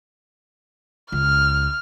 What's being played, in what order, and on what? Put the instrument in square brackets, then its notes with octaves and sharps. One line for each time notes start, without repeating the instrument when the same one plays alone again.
[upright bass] C#2 [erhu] F6